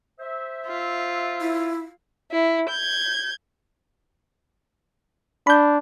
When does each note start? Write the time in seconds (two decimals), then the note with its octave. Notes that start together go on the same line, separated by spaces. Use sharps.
0.20 C5 E5
0.68 F4
1.41 E4
2.32 E4
2.69 G6 G#6
5.47 D4 B5 G6